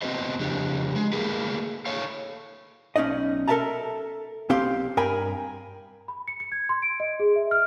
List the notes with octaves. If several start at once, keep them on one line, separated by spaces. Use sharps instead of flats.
B3 C4 F#4 B4 C5 D#5
F2 C#3 D4 G4
G#3
A3 A#3 G#4 A#4 B4
A4 C#5 F5
B1 C#4 D#4 D5 D#5
A4 A#4 D5 E5 A5 A#5
B1 C4 G4 F5 C6
G2 A#4 G5 G#5 B5
B5
C#7
C#7
G#6
C6
D7
D#5
G#4
E5
F6